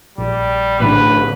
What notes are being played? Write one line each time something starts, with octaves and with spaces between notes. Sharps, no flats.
A#1 G3
A1 A2 D3 B4